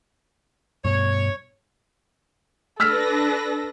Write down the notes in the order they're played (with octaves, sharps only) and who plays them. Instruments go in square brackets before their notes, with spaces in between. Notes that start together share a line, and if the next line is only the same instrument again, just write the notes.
[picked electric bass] G2 B2 [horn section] C#5
[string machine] D4 B4 A#6 [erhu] A4 [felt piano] E6 F6 B6